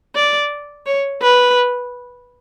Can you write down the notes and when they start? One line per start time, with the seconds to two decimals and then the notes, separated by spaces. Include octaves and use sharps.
0.15 D5
0.86 C#5
1.22 B4